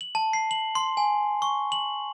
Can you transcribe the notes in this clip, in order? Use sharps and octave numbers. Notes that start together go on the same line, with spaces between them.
F#7
A5
C7
F#7
C6
G#5
C#6
F#7